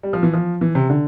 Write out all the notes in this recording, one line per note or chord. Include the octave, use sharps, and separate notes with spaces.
G3
F3
E3
F3
E3
C3
D3